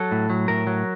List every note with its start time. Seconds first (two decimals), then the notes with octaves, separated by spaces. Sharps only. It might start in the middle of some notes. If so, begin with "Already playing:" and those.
Already playing: F#3 A4
0.12 A2
0.30 F#3
0.48 A2 A#4
0.67 F#3